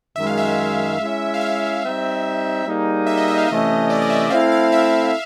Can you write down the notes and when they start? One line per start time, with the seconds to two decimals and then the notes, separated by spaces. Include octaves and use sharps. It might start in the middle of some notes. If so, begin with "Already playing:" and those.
0.16 F#2 D#3 G#3 E5
0.27 F5
0.37 E5
0.99 G#3 C#4 E4
1.34 F5
1.41 E5
1.83 G3 C4 D#4
2.66 G3 A#3 D#4 G#4
3.07 E5
3.17 D#5
3.28 E5
3.38 F5
3.48 C3 E3 A3 C#4 D#5
3.90 D5
4.01 D#5
4.10 E5
4.30 A3 C4 E4 A4 F5
4.52 F5
4.72 E5